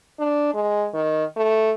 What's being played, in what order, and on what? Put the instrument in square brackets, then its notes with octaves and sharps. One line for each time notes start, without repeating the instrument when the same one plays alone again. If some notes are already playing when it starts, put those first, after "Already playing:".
[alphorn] D4
G#3
D#3
A3